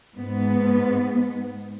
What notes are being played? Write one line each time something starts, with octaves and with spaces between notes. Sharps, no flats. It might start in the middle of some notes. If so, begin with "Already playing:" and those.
G#2 B3